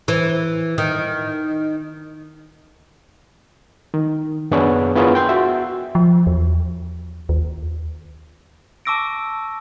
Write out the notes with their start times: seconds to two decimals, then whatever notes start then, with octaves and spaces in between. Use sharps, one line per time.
0.08 E3
0.78 D#3
3.94 D#3
4.51 F#2 B3 D4 G#4 C#5
4.95 B3 E4 F4 G#4 A#4 C#5
5.15 G5 C6 G6
5.29 F#4 E5
5.95 F3
6.27 E2
7.29 D#2
8.85 A5 C#6 D6 E6 A#6 D7